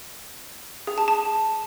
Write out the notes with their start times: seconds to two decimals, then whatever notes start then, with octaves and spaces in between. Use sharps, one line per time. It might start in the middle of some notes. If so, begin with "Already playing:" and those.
0.87 G#4
0.98 A5
1.08 A5